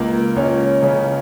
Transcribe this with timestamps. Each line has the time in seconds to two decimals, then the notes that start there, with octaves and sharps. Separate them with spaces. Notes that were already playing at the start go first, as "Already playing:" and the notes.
Already playing: C#2 A#3
0.36 C#2 C#4
0.83 C#3